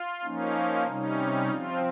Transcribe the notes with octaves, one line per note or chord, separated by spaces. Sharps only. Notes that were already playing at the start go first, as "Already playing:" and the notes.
Already playing: F4
F3 A#3 C#4 D#4
C3 G3 C#4 D#4
F3 C4 F4